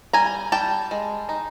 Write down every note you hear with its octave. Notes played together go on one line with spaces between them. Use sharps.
G3 G#5 A#5
G3 G5 A5
G#3
D#4